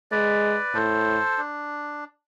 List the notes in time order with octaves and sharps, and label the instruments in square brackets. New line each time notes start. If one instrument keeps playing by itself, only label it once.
[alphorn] G#3 [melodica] B4 D5
[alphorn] A2 [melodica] A4 C5
[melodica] D4